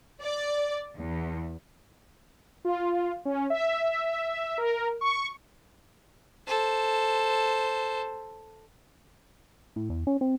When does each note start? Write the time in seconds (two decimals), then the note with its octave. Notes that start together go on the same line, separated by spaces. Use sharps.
0.21 D5
0.98 E2
2.65 F4
3.25 C#4
3.50 E5
4.58 A#4
5.01 C#6
6.47 A4 C5
9.76 A2
9.90 E2
10.07 C#4
10.21 C4